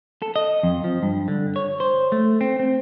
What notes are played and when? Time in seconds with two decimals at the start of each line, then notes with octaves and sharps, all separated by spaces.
0.22 A4
0.36 D#5
0.63 F2
0.84 F3
1.03 G2
1.28 D3
1.56 C#5
1.80 C5
2.12 A3
2.41 C4
2.59 C4